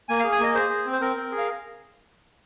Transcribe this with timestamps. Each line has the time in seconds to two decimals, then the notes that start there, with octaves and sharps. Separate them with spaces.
0.09 A#3 G#5
0.20 G#4 F5
0.32 G#5
0.40 A#3 D#5
0.54 G#4 C5
0.70 G#4
0.86 C4
0.93 C5
1.01 C4 A#4
1.17 C4
1.32 G#4
1.38 F5